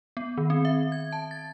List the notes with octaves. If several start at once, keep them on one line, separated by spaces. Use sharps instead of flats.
B3
D#3
C4
E5
G#6
A5
A6